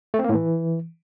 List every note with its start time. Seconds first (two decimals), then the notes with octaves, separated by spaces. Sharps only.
0.14 A3
0.19 C4
0.24 A#3
0.29 A2
0.34 E3